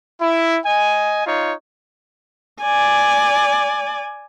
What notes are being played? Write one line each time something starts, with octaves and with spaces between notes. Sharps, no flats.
E4
D#5 G#5
D#4 F4 C#5
D5 G#5